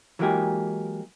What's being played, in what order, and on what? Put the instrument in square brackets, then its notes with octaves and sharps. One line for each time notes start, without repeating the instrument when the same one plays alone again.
[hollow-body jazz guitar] E3 F#3 G#3 A#3 G4 G#4